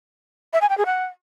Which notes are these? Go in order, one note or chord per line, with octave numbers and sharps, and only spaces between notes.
E5
G#5
G5
G#4
F#5